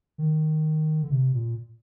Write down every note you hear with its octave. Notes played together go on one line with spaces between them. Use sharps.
D#3
D3
C3
A#2